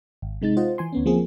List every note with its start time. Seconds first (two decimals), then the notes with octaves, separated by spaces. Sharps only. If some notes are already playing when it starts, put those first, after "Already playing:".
0.22 G#1
0.42 C3 G#3 D#4 A6
0.57 F4 C5 D#5 F#5
0.78 E3 G#5 C6
0.93 D2 B3 C#4
1.06 F3 A#3 C4 G#4